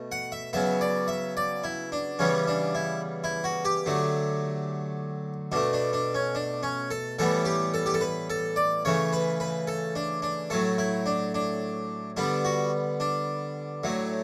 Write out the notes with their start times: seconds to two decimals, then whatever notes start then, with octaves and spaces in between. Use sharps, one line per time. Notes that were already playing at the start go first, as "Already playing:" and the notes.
Already playing: B2 A3
0.12 F#5
0.32 E5
0.53 C#3 F#3 B3 E5
0.81 D5
1.08 E5
1.37 D5
1.64 E4
1.92 D4
2.19 C#3 E3 G3 B3 C#4
2.48 D4
2.75 E4
3.24 E4
3.44 F#4
3.65 G4
3.86 D3 F#3 A3
5.52 B2 A3 D4
5.73 D4
5.93 D4
6.15 C#4
6.35 D4
6.63 C#4
6.91 A4
7.19 A2 E3 G3 B3 A4
7.45 G4
7.74 A4
7.86 G4
7.94 A4
8.01 B4
8.30 A4
8.56 D5
8.85 C#3 E3 A3 C#5
9.13 B4
9.40 B4
9.67 A4
9.95 D4
10.22 D4
10.50 A2 F#3 A3 A4
10.78 E4
11.06 D4
11.34 D4
12.17 D3 G3 B3 D4
12.45 F#4
13.00 D4
13.83 A2 F#3 A3